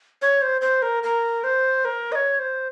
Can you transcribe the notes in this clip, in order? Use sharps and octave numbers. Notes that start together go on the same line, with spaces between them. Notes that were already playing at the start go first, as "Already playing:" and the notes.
C#5
C5
C5
A#4
A#4
C5
A#4
D#5
C#5
C5